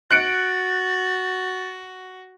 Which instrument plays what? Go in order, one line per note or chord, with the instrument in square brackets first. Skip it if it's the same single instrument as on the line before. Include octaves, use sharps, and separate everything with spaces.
[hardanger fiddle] F#4 [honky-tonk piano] F#6 C#7 D7 [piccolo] A6